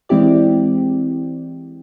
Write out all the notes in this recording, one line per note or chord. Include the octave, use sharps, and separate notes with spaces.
E3 G#3 C4 E4 G4 D5